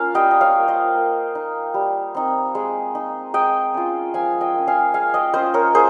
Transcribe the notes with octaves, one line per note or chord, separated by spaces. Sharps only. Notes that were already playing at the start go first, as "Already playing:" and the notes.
Already playing: A#3 C#4 F4 F5
G3 D#5 G5
D#5
C#5 F5
A#3 F4
C5 D#5
A#3
D#4
G3
C4 D#4
G#3
D#4
G#3 D#5 G5
C#4 F4
F3 F5 G#5
D#5 G5
A#3 C#4
F5 G#5
G#3 F5 G#5
D#5 G5
C#4 F4 C5 D#5
A#4 C#5
A#3 G#4 C5